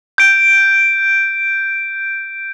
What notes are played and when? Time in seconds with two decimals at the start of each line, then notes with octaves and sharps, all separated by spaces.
0.18 G6 D7